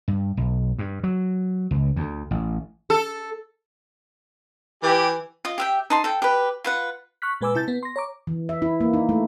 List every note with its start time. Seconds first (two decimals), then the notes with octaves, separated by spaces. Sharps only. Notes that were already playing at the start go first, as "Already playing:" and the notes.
0.08 G2
0.37 B1
0.79 G2
1.04 F#3
1.71 C#2
1.96 D2
2.31 A1
2.90 A4
4.83 E3 G4
5.45 F4 D#5
5.58 G4 E5 G5
5.90 D#4 A5 C6
6.04 A4 G5
6.22 G4 B4
6.64 F4 B4 F#5
7.22 C#6 F6 F#6 B6
7.41 A#2 G#3 B4 G#5 D6 E6
7.55 C3 E4 A5 G6 A6
7.68 B3
7.83 C6 A#6
7.96 C#5 A#5 D6
8.27 E3
8.49 E5
8.62 E4
8.81 A#3
8.94 D#4
9.09 A3